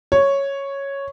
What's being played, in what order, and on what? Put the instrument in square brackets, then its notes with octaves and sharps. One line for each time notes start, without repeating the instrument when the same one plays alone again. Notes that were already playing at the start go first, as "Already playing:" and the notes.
[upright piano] C#5